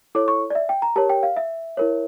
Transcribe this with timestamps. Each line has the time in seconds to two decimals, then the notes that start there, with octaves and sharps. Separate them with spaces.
0.15 E4 A4 C#5 D6
0.28 C#6
0.50 D5
0.55 E5
0.69 G5
0.82 A#5
0.96 G4 A#4 C#5 A5
1.09 G5
1.23 F5
1.37 E5
1.77 E4 A#4 C#5